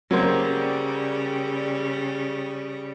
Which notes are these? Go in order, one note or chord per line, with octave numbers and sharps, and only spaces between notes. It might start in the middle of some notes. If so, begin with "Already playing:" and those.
C#3 F#3 G3 A#3 C5